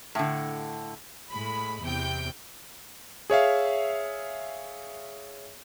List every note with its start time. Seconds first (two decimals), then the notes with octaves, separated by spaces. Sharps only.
0.15 A2 D3
1.29 A2 G#3 B5
1.82 E2 C3 G5 G6
3.30 G#4 C#5 E5 F5